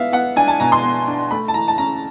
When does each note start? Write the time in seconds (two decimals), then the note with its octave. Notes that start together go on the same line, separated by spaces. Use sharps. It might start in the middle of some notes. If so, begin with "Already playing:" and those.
Already playing: B3 E5 F5
0.12 B3 F#5
0.36 D4 G#5
0.48 A5
0.60 B2 A#5
0.72 C6
0.83 B3
1.07 D4
1.31 A3 B5
1.48 A5
1.54 E3 A#5
1.68 A5
1.78 C#4 A#5